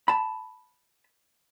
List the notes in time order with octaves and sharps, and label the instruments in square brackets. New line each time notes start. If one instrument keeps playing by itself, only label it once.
[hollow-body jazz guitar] A5 B5